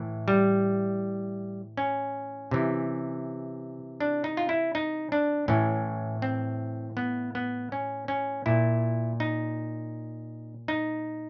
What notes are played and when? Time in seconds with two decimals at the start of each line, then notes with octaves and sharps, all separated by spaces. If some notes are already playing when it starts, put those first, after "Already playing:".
Already playing: A2 E3
0.28 G3
1.77 C#4
2.51 C3 E3
4.00 D4
4.24 D#4
4.37 F4
4.49 E4
4.75 D#4
5.12 D4
5.48 A2 E3 C#4
6.22 C4
6.97 B3
7.35 B3
7.72 C#4
8.08 C#4
8.46 A#2 E4
9.20 D#4
10.68 D#4